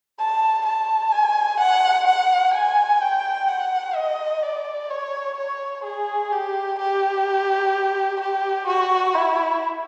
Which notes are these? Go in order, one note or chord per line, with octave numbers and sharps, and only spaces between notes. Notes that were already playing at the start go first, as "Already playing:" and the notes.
A5
A5
G#5
F#5
F#5
G#5
G5
F#5
D#5
D5
C#5
C#5
G#4
G4
G4
G4
F#4
E4